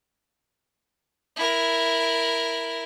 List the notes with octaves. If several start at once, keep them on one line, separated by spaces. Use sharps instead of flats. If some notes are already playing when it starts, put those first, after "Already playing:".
E4 A#4